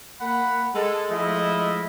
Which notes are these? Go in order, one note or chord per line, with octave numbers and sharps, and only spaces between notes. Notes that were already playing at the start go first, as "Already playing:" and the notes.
A#3 F#5 B5
G#3 A4
F3 G#3 A3 E4 F4 D#5